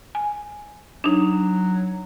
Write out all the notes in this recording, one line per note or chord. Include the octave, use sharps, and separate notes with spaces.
G#5
F#3 D4 D#4